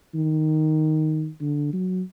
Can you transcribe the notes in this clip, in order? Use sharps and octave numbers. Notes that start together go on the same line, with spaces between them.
D#3
D3
F#3